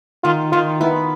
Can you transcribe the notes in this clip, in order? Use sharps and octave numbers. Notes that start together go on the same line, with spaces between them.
D#3 F4
D#3 F4
B3 E4